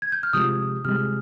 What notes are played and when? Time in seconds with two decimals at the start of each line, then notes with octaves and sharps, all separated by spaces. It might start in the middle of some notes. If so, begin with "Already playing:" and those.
0.02 G#6
0.12 G6
0.23 F6
0.33 C3 F3 G#3 D#6
0.84 C3 F3 G#3 F6